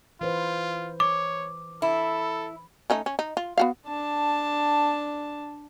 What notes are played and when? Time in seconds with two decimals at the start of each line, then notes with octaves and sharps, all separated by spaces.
0.21 E3 F4 B4 C5
1.00 C#5 D6
1.82 E4 A4
2.90 A3 C#4 D#4
3.06 C#4
3.19 D#4
3.37 F4
3.58 B3 F#4 F5
3.87 D4 A5